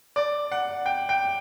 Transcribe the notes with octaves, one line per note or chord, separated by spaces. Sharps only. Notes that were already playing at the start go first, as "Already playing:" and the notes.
D5
F#5
G5
G5